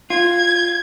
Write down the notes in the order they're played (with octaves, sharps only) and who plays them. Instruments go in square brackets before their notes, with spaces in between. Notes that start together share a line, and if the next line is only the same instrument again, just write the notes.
[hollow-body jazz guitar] F4 [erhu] G#6